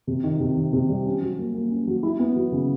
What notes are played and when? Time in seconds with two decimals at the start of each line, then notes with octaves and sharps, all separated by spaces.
0.07 C3
0.24 D#3
0.40 C3
0.57 D#3
0.73 C3
0.89 G3
1.06 C#4
1.22 F#3
1.38 A#3
1.54 A#3
1.70 C#4
1.87 F#3
2.03 E4
2.19 B3
2.36 F#3
2.52 C#3